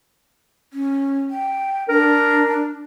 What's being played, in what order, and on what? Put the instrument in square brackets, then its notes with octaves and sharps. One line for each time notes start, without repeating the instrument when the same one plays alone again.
[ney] C#4
G5
[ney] D4 [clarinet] A#4